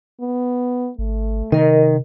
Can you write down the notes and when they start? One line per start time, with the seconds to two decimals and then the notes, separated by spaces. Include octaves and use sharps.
0.21 B3
0.98 G#1 A3
1.52 C3 D#3 A#4 D#5